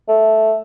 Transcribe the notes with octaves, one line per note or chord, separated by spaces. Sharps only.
A3